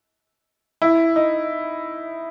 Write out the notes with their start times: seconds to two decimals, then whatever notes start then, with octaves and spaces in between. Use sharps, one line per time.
0.82 E4
1.16 D#4